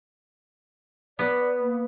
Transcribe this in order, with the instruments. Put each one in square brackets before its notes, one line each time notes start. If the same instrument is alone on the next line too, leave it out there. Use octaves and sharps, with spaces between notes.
[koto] B3 [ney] D5
[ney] A#3